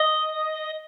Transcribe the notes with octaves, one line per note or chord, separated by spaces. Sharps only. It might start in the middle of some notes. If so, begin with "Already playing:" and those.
Already playing: D#5